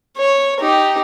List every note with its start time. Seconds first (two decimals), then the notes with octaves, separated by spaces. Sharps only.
0.17 C#5
0.60 D#4 G4